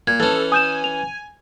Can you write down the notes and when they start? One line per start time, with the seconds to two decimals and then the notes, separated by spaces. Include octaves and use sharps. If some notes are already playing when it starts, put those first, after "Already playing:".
0.07 A#2 G#6
0.20 E3 C#4 A4
0.52 G#5 D#6 G6 E7
0.84 F7